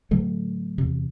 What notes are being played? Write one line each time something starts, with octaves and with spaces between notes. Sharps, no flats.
A2 D3 F#3 A3
E2 C3